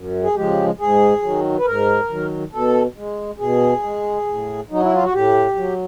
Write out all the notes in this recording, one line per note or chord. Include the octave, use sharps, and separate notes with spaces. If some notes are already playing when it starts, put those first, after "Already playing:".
Already playing: F#2
G#4
C#3 F3 G#3 G4
G#2 G#4
D#3 F#3
B4
G#2 A#4
D#3 F#3
B2 A4
G#3
B2 G#4
G#3
A2
F#3 D#4
E4
F4
F#4
A2 G4
F#3